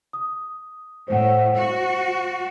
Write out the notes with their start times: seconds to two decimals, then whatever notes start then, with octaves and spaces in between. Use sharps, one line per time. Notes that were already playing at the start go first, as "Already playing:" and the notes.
0.13 D#6
1.08 A2 C5 F#5
1.55 F#4